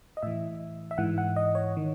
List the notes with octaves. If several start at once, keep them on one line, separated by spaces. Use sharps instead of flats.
D#5
A2 E3 E5
E5
G#2 E3 F#5
F#5
D#5
C#5
D#3